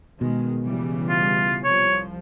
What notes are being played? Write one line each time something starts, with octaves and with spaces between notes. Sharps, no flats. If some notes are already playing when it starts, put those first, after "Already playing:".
B2 D#3 G#3
C#3 E3 G3
F4
C2 F3 C#5